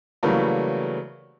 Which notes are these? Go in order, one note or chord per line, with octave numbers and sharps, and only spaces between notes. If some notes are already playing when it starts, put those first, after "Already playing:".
C#3 E3 F#3 G3 A3 A#3